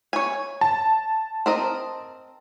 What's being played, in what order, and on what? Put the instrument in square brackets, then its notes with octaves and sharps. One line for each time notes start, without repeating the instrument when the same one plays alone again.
[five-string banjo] C#5 G#5
[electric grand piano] A5
[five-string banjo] C4 A#4 D#5